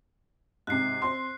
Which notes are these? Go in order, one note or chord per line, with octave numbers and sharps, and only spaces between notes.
G#2 C3 F#6 C7
C4 C6